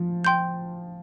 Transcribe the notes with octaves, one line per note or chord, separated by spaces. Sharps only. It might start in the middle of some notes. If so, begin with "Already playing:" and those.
Already playing: F3
G5 C6 G6